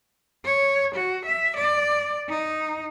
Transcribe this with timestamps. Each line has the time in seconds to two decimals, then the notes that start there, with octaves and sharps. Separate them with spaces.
0.45 C#5
0.95 F#4
1.26 E5
1.57 D5
2.29 D#4